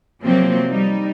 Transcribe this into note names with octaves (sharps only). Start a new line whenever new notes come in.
C3 F3 F#3 A#3 C4
G3 D#4